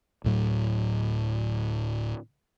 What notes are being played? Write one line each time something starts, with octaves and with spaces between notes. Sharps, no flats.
D1 A2 F#3